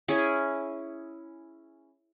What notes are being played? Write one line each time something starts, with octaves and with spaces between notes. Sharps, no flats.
C#4 E4 G#4